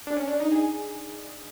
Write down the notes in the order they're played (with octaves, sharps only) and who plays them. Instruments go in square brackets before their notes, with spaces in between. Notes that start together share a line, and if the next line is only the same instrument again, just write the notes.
[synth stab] D4
C#4
D4
D#4
G#4